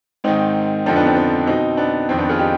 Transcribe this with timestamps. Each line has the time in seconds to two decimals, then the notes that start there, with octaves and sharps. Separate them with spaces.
0.24 G#2 D#3 C4 D#4
0.86 F2 D3 F3 C4 D#4
0.96 B3 D4
1.06 C4 D#4
1.16 C4
1.47 B2 C4 D#4
1.77 B3 D4
2.09 F2 D#3 C4
2.18 B3 D4
2.29 F4 G#4
2.39 D#4 G4